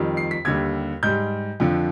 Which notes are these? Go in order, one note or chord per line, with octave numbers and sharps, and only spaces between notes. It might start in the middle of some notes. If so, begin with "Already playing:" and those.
Already playing: F2 D#3 G3
C7
B6
D#2 D3 G3 G#6
G#2 G3 G6
F2 D3 F3